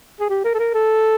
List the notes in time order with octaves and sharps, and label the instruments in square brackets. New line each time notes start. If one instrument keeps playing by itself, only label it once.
[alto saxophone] G#4
G4
A#4
A4
A#4
A4